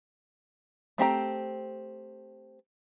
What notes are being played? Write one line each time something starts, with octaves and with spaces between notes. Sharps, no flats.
A3 C4 G4 A#5